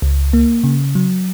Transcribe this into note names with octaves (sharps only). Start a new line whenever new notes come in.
C#2
A#3
C#3
F#3